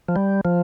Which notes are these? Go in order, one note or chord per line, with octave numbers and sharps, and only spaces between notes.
F3
G3
F3